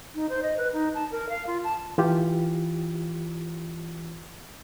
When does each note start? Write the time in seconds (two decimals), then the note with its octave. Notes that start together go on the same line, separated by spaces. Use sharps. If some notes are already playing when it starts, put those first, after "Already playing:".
0.15 D#4
0.29 C5
0.43 D#5
0.57 B4
0.73 D#4
0.95 A5
1.11 A#4
1.29 F5
1.47 F4
1.64 A5
1.98 E3 F4 G4